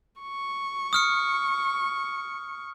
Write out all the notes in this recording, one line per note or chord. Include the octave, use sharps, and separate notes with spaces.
C#6
D#6 F6 C#7